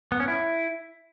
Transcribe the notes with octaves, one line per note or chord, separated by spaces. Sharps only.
B3
C#4
E4